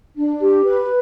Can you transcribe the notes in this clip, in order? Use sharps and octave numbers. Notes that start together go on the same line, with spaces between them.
D4
G4
B4